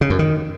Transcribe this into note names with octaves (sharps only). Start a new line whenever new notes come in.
C#3
F#2
D#3